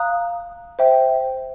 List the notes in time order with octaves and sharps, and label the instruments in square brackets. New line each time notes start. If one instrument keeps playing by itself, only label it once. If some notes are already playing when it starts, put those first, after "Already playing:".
Already playing: [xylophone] F5 A#5 D#6 F#6
C5 E5 G5